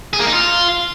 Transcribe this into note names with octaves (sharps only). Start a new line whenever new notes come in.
G#4
A#3
D#4
F4